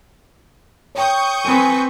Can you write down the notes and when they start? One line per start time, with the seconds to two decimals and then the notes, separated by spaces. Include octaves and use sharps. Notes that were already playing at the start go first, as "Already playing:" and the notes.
0.95 C#5 G5 C#6 D#6 G6
1.45 C4 B4 G#5 D#7